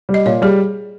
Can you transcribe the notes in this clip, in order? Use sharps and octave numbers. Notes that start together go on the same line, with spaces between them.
G3
D#5
A#2 C#5
G3 G#4